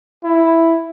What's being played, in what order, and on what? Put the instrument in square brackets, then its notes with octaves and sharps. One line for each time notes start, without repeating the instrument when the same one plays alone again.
[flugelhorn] E4